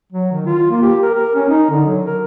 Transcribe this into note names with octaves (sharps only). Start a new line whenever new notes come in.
F#3
D#3
F4
A#3
G4
A#4
A#4
C#4
D#4
D3
F#3
A#4